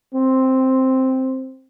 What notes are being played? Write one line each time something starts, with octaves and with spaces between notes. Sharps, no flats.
C4